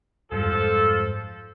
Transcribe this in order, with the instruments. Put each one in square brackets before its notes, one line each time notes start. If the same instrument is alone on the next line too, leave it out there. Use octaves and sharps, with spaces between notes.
[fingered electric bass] F2 G#2 G3 [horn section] F3 A4